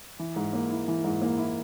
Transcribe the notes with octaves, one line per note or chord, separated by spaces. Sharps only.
E3
G#2
A#3
E4
E3
G#2
A#3
E4